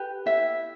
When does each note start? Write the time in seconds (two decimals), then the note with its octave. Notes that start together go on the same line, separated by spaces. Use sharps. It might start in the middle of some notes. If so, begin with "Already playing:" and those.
Already playing: G4 B4
0.26 E4 E5